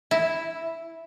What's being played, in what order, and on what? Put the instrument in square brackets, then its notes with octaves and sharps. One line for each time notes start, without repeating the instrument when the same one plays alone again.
[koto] E4